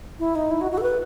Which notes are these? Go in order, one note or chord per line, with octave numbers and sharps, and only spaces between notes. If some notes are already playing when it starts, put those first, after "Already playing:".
E4
D#4
E4
F#4
F#4
A4
B4